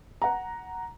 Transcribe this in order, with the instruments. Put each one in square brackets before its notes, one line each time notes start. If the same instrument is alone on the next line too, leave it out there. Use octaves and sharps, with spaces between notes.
[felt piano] F#5 A#5